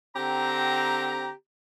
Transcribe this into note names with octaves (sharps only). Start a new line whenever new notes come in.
D3 C4 G4 A#5